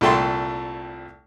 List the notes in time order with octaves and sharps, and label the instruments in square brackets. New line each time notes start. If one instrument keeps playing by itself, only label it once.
[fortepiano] C2 A#2 A3 G5 A5 C6